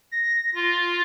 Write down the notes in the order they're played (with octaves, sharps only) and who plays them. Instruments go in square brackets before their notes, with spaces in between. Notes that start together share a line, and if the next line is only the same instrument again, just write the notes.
[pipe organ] A#6
F4